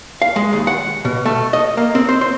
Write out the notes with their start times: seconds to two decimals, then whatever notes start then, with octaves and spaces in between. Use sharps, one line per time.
0.22 F5
0.36 G#3
0.53 D#2
0.67 F#5
1.05 B2
1.25 A3
1.53 D#5
1.77 A#3
1.95 C4
2.09 C5
2.21 C5